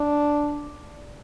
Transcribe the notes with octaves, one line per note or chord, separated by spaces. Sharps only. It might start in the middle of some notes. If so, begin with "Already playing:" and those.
Already playing: D4